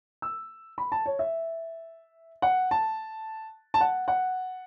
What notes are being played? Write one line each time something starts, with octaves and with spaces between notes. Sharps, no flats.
E6
B5
A5
C#5
E5
F#5
A5
A5
F#5
F#5